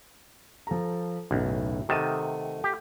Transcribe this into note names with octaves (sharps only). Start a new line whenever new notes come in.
F3 A4 A#5
B1 F#2 A2 C#3
C3 D#3 A3 F#5 A5 D#7
G4